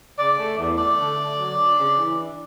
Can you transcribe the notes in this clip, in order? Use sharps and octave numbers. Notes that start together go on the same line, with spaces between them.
C#3 D5
A3
E2
A3 D5
D3
D3
F#3
D4
C#3
E3
D4